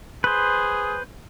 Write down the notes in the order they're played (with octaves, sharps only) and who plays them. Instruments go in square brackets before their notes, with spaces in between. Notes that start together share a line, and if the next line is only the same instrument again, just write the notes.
[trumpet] G#4 [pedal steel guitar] B4 C5